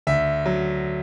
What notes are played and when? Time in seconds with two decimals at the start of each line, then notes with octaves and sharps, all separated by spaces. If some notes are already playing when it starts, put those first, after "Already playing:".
0.07 D2 E5
0.46 F#3